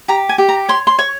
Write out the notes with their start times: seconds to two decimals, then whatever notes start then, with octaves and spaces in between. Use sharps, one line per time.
0.08 G4 A#5
0.29 G#5
0.38 G4
0.49 A#5
0.69 C#5 C6
0.87 C6
0.99 C#5 C#6